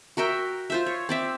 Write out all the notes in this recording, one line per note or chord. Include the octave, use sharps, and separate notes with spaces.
F#4 A#4 E5 G5
F4 C5 E5
C#5
C4 D5 E5